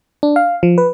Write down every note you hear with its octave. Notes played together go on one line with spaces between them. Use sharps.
D4
F5
F3
B4